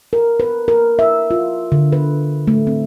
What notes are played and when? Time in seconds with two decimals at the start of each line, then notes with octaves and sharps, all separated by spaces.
0.13 A#4
0.40 B4
0.68 A#4
0.99 E5
1.31 F4
1.72 D3
1.93 B4
2.48 A3
2.67 C4